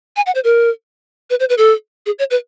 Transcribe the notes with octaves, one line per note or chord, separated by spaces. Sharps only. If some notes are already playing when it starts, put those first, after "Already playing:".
G#5
F#5
C5
A#4
B4
C5
B4
A4
G#4
C#5
B4